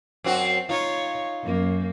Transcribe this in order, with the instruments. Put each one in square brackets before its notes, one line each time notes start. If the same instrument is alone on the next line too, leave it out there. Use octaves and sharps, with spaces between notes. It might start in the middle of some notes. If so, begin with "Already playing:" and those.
[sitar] F#2 C4 F#4
[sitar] D#4 F4 [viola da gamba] C#5
[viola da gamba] F#2 A#3